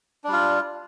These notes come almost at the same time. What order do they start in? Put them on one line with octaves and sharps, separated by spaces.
D4 G3 F4